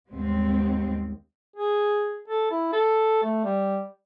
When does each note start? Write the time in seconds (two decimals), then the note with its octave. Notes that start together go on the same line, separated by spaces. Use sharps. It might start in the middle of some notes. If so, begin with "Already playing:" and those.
0.11 D#2 G#2 G3 G#3 B3 C4
1.56 G#4
2.28 A4
2.51 E4
2.73 A4
3.23 A3
3.44 G3